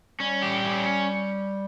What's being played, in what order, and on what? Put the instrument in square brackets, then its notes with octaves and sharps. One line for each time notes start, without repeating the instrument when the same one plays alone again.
[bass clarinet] G3 [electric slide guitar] C#4
[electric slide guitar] G4
C#4